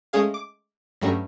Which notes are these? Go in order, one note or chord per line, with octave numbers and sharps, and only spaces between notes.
G#3 A3 C#4 G#4 F5
D6
G2 F#3 G3 A3 C#4